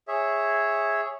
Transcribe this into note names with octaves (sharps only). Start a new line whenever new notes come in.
G#4 C#5 E5